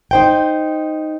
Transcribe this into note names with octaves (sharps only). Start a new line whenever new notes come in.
D#4 C5 G5